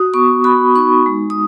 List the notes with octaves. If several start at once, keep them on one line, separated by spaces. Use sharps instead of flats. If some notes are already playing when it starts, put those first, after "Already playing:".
Already playing: F#4 D#6
B3 C#6
F#4 B5
D#4 C#6
G#3
D#6